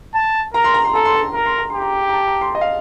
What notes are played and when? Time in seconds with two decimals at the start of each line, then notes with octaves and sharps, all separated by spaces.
0.15 A5
0.54 A#4 A#5
0.64 C6
0.74 A#5
0.85 C6
0.94 A4 A#5
1.05 C6
1.15 A#5
1.34 A#4 A#5
1.46 C6
1.59 A#5
1.70 G4 C6
1.82 A#5
2.09 A#5
2.14 A5
2.27 A#5
2.41 C6
2.55 D#5
2.61 F5